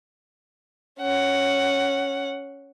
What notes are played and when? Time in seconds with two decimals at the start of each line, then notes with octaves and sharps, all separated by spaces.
1.01 C#4 F#5